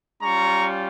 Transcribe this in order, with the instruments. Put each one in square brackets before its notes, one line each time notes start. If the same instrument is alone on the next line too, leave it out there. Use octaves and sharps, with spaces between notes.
[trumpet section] G3 C#4 F4 A#5 C#6